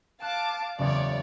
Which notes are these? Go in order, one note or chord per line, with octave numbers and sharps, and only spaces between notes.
F5 A5 D6 F#6
F#1 E2 C#5 D5